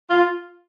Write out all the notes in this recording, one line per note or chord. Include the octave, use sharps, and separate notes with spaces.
F4